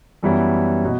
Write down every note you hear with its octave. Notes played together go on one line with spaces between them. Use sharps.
F#2 E3 G3 B3 E4
B2